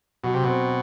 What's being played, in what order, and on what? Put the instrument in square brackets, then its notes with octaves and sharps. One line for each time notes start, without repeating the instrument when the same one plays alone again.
[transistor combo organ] B2 [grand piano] F#3
[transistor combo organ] C3
[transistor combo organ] B2 [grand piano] C4